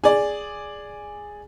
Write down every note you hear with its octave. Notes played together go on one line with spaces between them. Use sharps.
G#4 D5